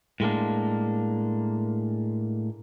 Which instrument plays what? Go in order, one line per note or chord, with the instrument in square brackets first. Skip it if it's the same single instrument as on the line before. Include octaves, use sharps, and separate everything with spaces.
[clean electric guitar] A2 G#3 A#3 D4